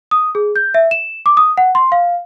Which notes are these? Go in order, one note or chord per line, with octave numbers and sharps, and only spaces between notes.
D#6
G#4
G6
E5
E7
D6
D#6
F#5
C6
F5